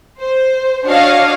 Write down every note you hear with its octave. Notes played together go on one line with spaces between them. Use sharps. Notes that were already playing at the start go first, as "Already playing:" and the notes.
C5
D4 F#4 C#5 D#5 F5